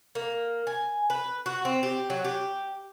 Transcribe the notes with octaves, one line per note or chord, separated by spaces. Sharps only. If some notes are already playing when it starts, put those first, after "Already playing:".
A#3
G#5
B4
F#4
C4
G4
F#3
G4